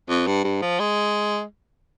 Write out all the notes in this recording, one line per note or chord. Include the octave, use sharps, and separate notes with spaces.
F2
G2
G2
F3
G#3